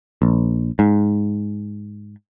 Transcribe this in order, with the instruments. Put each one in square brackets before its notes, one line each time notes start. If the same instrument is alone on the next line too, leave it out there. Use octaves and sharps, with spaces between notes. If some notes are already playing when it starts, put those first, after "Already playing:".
[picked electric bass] A#1
G#2